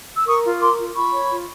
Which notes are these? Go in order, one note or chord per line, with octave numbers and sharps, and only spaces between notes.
E6
A#4 C#6 D#6
F4
A#4 C6 D6
F4
F4 B5 C#6
C#5
F4